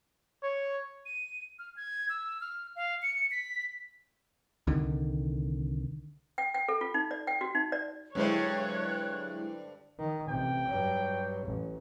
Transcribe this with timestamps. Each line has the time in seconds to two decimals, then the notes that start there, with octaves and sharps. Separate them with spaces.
0.43 C#5
1.06 D#7
1.59 F6
1.76 G#6
2.09 E6
2.41 F6
2.76 F5
3.02 C#7
3.31 B6
4.67 C2 D3 D#3
6.38 G5
6.54 G5
6.68 A4
6.81 F4
6.94 D#4
7.11 D5
7.27 G5
7.41 F#4
7.55 D#4
7.72 D5
8.15 G2 D3 F#3 G#3 E4 C5 C#5 F#6
9.99 D#3
10.29 A1 C3 G5
10.67 G2 F#3
11.46 A1